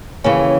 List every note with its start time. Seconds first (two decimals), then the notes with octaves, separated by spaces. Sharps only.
0.24 D#2 C#3 E3 C#4